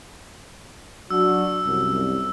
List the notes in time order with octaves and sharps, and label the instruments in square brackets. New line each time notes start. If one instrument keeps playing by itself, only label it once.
[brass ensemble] F#3 D4 F#4 [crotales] E6
[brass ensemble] C2 F#2